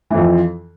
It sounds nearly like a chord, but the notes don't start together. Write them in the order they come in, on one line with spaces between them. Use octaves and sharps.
E3 F2 F3